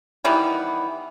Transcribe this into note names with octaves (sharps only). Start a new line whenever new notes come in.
D#3 E3 G3 B3